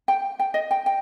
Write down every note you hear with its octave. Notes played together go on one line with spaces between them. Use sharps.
G5
G5
D#5
G5
G5